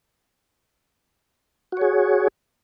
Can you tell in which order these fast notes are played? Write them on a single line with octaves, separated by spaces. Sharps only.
F#4 C#5 G#4